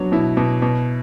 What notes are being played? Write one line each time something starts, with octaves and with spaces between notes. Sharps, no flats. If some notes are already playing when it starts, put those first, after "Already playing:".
Already playing: F#3 B3 D4
B2 E4
B2
B2